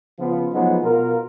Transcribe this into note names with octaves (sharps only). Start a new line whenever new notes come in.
C#3 F3 B3 F4
F3 F#3 G#3 A3 B3 D#4
B2 F4 A#4